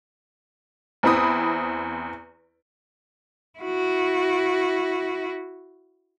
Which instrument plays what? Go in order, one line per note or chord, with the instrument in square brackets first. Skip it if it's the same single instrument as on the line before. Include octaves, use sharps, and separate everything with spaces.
[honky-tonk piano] E2 C4 E4 B5 D#6
[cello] E4 F#4